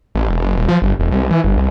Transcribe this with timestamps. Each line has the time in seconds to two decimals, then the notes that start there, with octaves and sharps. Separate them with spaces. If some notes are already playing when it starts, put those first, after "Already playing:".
0.15 A1
0.30 E1
0.42 F#1
0.56 D#1
0.68 F3
0.82 G1
0.99 E1
1.11 C2
1.31 E3
1.44 G1
1.57 C2